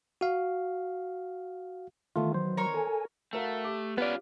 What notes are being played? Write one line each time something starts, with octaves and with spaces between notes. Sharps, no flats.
F#4 F5
D#3 E3 A3 B3 F4
F#3 C5
A#4 C#5
A4 G#5
A3 F#4 A#4 F5
G4 D6
B3 C#4 F4 B4 D5